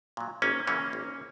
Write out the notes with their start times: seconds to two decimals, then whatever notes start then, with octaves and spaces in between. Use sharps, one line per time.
0.17 A#2 F#3
0.42 G#1 A#3 C#4
0.67 F#2 C#3 E3 A#3 C#4
0.93 G#1